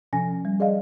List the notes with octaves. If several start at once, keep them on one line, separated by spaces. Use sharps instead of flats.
C3 F3 C#4 G#5 A#6
G3
G#4 D5 D#5 F5